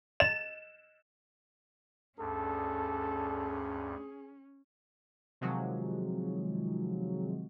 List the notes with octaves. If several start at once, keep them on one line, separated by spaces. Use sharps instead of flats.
D#5 E7
D2 G2 C#4 G#4 A4
C3 D#3 F3 F#3 G#3